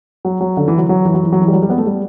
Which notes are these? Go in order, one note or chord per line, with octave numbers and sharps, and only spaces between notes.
F#3
F#3
D3
E3
F#3
F#3
E3
F#3
E3
F#3
E3
G3
F#3
G3
B3
A3
G3